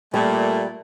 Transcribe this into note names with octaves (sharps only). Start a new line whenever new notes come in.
A#2 G3 A3